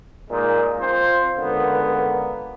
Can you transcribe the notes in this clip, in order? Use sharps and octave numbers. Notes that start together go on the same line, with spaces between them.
A#2 G#3 A#3 D#4
C4 F4 C5
C#2 D3 A#3 B3